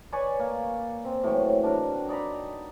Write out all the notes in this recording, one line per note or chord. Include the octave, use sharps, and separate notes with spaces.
B4 C#5 D5 G#5
A#3
C4
A2 E3 F#3 G5
D4 A#4
D#4 D5 A#5 B5